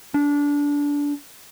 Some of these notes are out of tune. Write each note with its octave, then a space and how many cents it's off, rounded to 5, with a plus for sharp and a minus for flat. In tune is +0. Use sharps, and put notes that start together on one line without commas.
D4 -20